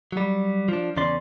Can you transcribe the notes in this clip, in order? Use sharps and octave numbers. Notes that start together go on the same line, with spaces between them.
F#3 G3
F3 D4
E2 C#3 C#4 D5 C6